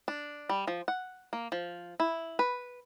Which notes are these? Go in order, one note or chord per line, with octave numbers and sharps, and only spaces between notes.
D4
G3
F3
F#5
A#3
F3
E4
B4